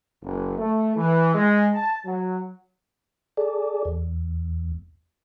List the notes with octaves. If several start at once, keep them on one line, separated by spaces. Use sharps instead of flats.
F#1
A3
E3
G#3
A5
F#3
G#4 A4 D5
E2